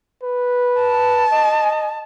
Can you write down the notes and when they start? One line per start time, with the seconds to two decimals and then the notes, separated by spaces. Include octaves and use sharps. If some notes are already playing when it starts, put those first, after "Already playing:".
0.23 B4
0.81 A5
1.32 D#5